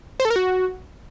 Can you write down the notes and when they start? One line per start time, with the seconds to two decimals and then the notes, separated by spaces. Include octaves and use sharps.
0.20 C5
0.25 A4
0.30 A#4
0.36 F#4